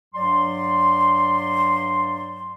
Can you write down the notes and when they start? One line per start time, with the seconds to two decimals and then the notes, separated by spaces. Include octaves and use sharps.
0.14 G2 F#3 D5 C6